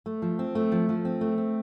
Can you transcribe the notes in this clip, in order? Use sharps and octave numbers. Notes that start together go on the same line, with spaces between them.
A3
F3
C4
A3
F3
F3
C4
A3
C4